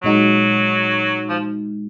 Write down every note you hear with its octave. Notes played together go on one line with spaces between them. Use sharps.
A#2 F#3 G#3 D#4 F#4
F3